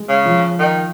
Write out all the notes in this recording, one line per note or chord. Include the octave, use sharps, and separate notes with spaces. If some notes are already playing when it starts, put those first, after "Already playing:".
Already playing: G#3
C#3
F3
D#3